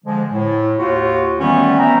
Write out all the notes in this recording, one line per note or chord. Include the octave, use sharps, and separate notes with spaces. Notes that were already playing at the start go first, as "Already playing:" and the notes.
D3 F3 G#3
A2
D#2 F4 F#4
D#3 E3 G3 A3 B3 C#4
B3 E5 G5 A#5